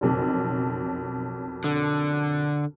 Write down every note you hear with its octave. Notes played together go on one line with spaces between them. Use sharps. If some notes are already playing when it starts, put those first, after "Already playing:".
F#1 B1 F2
D3